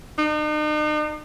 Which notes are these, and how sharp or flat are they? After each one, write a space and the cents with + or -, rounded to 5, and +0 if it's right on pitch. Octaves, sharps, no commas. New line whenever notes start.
D#4 -45